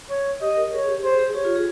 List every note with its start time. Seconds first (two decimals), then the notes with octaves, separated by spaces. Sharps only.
0.10 C#5
0.41 G4 D#5
0.56 A#4
0.73 G#4 C#5
0.89 G4
1.04 G#4 C5
1.19 G#4
1.35 G4 C#5
1.45 F4
1.56 G#4